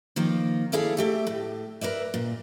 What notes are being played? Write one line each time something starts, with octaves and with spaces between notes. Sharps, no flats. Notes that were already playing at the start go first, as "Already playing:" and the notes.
D#3 F3 A#3
E4 G#4 A4 D5 E5 F5
A3 G4 E5
A2
A#4 B4 D5 E5
A#2